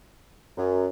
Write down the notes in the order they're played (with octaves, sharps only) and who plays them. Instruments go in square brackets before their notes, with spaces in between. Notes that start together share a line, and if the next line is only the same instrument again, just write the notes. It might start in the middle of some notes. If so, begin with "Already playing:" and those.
[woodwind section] F#2